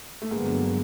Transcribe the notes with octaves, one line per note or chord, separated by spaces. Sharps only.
A3
G2 D3 F#3 G#3 A#3 B3